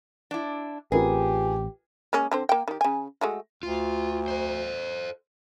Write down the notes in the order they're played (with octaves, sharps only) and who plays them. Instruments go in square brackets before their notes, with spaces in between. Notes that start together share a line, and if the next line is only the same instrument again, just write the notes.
[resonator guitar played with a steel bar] D4 E4
[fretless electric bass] A1 C4 [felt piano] F4 A#4 B4 [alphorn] G4 [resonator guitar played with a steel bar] G#4
[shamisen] G#3 A#3 C#4
D3 C4 C5
A#3 G5
D#3 G4
C#3 G#5
G#3 A3 F#4
[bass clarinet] D2 [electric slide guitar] F4
[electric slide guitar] A4 C5